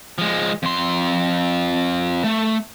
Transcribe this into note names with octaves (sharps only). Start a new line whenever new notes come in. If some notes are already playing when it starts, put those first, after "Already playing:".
F3 G#3
F2 C6
A3